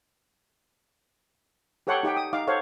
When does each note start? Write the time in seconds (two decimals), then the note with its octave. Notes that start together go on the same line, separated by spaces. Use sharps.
1.87 G4 A4 C#5 F#5 G5 C6
2.03 D#4 G4 F#5 G5
2.17 D#6
2.33 D#4 F5 D6
2.47 A4 C5 C#5 F5 F#5